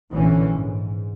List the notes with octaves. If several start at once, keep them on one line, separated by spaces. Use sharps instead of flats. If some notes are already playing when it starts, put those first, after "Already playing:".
A#1 B2 D3 E3 C#4
G#2